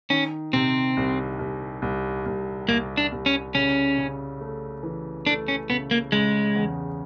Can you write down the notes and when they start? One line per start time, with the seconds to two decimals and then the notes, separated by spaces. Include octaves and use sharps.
0.10 D#3 C#4
0.53 C3 C4
0.97 C2
1.39 C2
1.82 C2
2.26 C2
2.68 C2 A#3
2.97 D4
3.12 C2
3.26 C#4
3.55 C#3 C#4
3.98 C#3
4.41 A3
4.83 E3
5.26 A3 D4
5.48 C#4
5.69 C#3 B3
5.91 A#3
6.12 C#3 G#3
6.55 E2